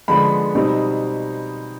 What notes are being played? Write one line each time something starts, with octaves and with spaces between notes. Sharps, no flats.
D3 F3 G#3 B3 D4 B5
B2 G3 C4 D#4